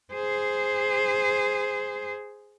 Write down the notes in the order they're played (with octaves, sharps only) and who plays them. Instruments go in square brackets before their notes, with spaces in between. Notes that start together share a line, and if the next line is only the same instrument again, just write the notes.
[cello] G#4 C5